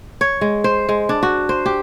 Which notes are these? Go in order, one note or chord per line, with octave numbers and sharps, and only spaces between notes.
C#5
G#3
C5
G#3
D4
F#4
C5
G4